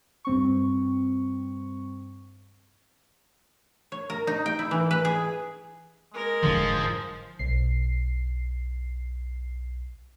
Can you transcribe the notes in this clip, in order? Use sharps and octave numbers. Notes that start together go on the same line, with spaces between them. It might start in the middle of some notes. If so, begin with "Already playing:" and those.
G2 C4 C#6
C#5
A#4
D#4
G5
E4
E3
B4
G#4
G#3 A#4
F1 G#2 D3 F3
B1 C7